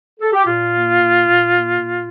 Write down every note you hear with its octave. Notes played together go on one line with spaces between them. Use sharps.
A4
G4
A#2 F4
A#3
A#2
A#2
A#3
A#2